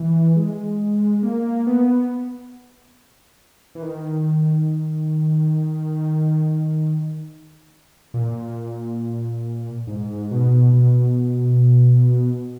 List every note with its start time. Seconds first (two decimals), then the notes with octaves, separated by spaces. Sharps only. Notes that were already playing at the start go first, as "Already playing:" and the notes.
Already playing: E3
0.36 G#3
1.23 A#3
1.67 B3
3.75 E3
3.83 D#3
8.14 A#2
9.87 G#2
10.31 B2
10.73 B2